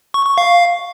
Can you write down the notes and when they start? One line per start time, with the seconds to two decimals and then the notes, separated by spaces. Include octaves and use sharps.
0.14 C#6
0.26 C#6
0.38 F5